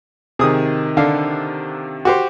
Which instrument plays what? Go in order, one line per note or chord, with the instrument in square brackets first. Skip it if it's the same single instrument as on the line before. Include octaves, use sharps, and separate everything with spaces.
[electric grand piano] C3 D#3 [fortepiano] G#4 D#6
[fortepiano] D3 D4 F5
F#4 G4 C5